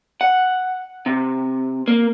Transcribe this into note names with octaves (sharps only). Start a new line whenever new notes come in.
F#5
C3
A#3